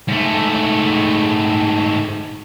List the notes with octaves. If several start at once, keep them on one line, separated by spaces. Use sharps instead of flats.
G#2 A3